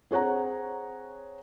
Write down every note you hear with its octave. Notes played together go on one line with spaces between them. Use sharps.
C4 G#4 C#5 F#5 A#5